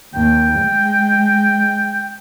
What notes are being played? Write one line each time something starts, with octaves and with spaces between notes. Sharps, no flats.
D#2 G5
G#3